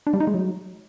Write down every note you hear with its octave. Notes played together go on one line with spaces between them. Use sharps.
D4
G3
D#4
G#3
F#3